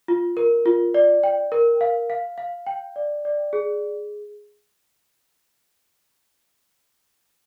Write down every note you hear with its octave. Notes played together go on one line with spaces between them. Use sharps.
F4
A#4
F4
D5
G5
A#4
F5
F5
F5
G5
D5
D5
G#4